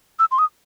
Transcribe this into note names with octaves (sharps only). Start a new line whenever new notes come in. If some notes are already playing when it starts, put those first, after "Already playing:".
E6
C6
D#6